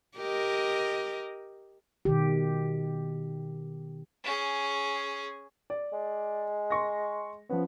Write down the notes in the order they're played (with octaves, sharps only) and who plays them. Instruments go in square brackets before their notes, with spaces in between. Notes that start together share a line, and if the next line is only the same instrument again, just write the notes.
[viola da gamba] G4 A#4 D#5
[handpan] B2 D#3 G4
[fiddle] C#4 G#4
[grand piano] D5
[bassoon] G#3
[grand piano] C6 C#6 A#6
[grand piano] F3 C#4 [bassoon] B3